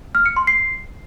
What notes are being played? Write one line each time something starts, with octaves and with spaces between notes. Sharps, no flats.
F6
C#7
C6
C7